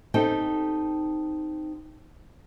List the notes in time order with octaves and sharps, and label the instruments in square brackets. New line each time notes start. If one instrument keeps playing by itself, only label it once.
[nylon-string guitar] C4 D#4 G4 A4 G5 A5